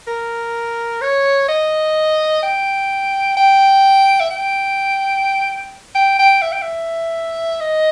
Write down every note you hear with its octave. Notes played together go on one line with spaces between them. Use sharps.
A#4
C#5
D#5
G5
G5
E5
G5
G5
G5
E5
G5
E5
D#5